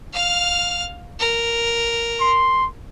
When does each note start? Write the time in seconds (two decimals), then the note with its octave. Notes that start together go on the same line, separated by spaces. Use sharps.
0.14 F5 F6
1.20 A#4
2.21 C6